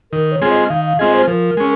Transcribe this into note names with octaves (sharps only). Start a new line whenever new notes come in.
D#3 A#4
C#5
G#3 C4 F4 G#4
D#5
D#3 F5
F5
G#3 C4 F4 G#4 D#5
C5
F3 A#4
G#3 C#4